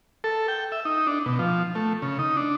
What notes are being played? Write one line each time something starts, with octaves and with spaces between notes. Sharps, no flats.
A4
G5
E5
D#4
D4
B2
F3
A3
C#3
D#4
D4